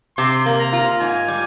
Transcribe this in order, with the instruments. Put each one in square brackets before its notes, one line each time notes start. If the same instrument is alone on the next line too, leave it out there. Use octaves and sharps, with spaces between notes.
[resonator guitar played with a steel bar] C3 [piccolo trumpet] C6
[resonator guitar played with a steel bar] A#3
[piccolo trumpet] A#5
[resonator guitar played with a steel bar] F4
[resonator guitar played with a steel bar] G#2 [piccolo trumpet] G#5
[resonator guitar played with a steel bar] G3